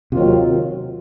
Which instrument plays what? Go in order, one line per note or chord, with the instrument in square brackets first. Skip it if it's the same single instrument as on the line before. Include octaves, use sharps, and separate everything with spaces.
[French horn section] D#2 D#3 F#3 C4 F4 [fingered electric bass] C3